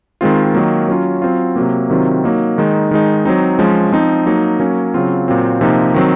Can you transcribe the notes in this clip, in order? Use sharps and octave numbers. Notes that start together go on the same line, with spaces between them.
D#3 G#3 C4 F4
D#3 F#3 A#3
F#3 C#4 F4
F#3 C4 F4
C3 F#3 A#3
C3 D#3 F#3 C4 F4
F#3 A#3 D#4
D#3 G#3 D#4
D#3 G#3 D#4
F#3 C4 D#4
F3 G#3 C#4
F3 C4 D#4
F#3 A#3 D#4
F#3 A#3 C#4
C#3 F#3 C4 F4
A#2 F#3 C4 F4
C3 F3 A#3 D#4
D#3 F#3 C4